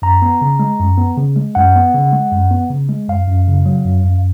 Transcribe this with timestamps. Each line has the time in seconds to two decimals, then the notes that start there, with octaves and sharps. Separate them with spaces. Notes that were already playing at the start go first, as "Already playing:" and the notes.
0.02 F#2 A#5
0.22 B3
0.41 C#3
0.60 G#3
0.80 F#2
0.98 B3
1.17 C#3
1.36 G#3
1.55 F#2 F#5
1.75 B3
1.95 C#3
2.13 G#3
2.32 F#2
2.51 B3
2.70 C#3
2.89 G#3
3.08 F#2 F5
3.28 F#2
3.48 C#3
3.66 F#3
3.85 F#2
4.05 F#2